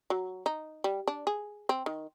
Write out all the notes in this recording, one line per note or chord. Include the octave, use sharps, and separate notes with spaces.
F#3
D#4
G3
D4
G#4
C4
D#3